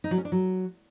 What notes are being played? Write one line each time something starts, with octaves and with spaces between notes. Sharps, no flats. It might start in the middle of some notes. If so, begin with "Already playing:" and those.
D#4
F#3
C#4
D4
F#3